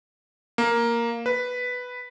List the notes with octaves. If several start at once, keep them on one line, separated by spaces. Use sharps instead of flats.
A#3
B4